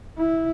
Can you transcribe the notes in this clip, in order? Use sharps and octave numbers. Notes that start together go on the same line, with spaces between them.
E4